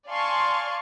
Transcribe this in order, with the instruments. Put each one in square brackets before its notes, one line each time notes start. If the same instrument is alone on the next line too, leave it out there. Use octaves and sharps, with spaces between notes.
[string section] D5 F5 G#5 A5 C6 C#6